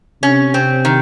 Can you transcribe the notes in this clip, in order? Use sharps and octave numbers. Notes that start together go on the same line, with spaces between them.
C3 C#4
C4
D#3